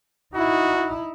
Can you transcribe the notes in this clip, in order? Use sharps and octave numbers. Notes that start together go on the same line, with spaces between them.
D#4 E4 F#4